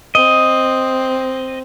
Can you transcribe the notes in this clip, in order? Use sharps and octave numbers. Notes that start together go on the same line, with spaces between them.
C4 D#5